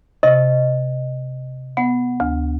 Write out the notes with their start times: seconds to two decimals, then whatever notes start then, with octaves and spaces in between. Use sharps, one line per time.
0.23 C3 D#5
1.77 B3 F#5
2.20 D2